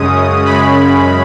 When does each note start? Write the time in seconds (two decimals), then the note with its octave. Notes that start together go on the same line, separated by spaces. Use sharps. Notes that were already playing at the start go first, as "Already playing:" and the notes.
Already playing: F#2 C#3 G#3 C#4 D#6
0.45 F#2 C#3 G#3 C#4 B5